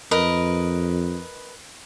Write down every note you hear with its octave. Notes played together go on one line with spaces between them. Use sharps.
F2 A#4 B4 D#5